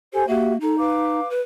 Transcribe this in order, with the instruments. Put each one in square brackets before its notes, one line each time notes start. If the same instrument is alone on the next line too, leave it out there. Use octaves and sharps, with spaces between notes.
[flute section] G4 C5 G#5 [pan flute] A4
[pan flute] A#3 [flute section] F#4 G4 E5
[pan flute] D#4 [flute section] A4
[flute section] B4 F5 D6
[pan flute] B4